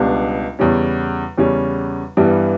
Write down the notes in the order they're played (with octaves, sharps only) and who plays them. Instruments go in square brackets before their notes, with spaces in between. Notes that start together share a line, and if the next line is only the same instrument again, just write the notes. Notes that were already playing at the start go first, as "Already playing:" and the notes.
Already playing: [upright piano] C#2 B2 G3 B3 D4
E2 C#3 G3 C#4
E2 C#3 G3 C#4
G2 E3 G3 B3